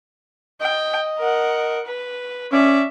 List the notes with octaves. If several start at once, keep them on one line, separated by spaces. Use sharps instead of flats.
D#5 G5
A#4 F#5
B4
C#4 D5 E5